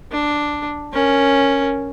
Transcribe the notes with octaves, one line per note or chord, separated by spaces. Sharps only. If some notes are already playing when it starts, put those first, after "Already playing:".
D4
C#4 A#4